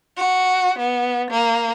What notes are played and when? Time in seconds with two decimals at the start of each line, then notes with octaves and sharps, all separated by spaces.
0.16 F#4
0.77 B3
1.29 A#3